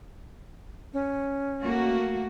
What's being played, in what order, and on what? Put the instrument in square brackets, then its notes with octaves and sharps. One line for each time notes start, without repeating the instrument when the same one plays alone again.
[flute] C#4
[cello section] A3 A#3 F#4